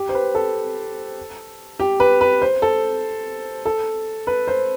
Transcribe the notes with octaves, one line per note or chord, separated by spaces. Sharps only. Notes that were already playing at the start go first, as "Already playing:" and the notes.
Already playing: G4
C5
B4
A4
G4
B4
B4
C5
A4
A4
B4
C5